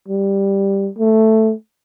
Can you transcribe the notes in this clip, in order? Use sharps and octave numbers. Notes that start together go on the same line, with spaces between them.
G3
A3